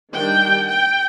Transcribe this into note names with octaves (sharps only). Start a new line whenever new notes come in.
D#3 G3 D4 G5
G5